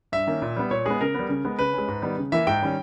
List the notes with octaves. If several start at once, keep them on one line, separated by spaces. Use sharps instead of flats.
G2 E5
D#3 A#3 C#4
A#2
G3 B3
A#2 C#5
G#3 B3 G#4
C#3 A#4
G3 B3
C#3
G#3 B3
C#3 B4
G#3 C#4
G#2
D#3 G3 B3
C#3
E3 A#3 E5
G#2 G5
D#3 G3 C#4